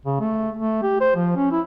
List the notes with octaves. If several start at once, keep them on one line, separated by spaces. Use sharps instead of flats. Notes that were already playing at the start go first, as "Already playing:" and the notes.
C#3
A3
A3
G4
C5
F3
C#4
E4